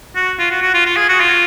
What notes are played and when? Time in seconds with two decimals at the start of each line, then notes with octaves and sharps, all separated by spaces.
0.15 F#4
0.39 F4
0.51 F#4
0.62 F#4
0.74 F4
0.86 F4
0.97 G#4
1.09 F#4
1.20 F4